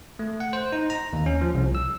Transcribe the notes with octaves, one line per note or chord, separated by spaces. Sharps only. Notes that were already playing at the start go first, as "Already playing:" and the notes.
A3
F#5
C5
D#4
A#5
D#2
C#4
F3
C2
E6